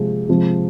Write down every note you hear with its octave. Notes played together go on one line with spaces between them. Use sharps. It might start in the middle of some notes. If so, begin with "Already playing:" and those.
Already playing: C3 F3 G#3
C3 F3 G#3